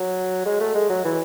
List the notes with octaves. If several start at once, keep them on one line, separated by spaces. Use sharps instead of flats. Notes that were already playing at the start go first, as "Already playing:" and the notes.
Already playing: F#3
G#3
A3
G#3
F#3
E3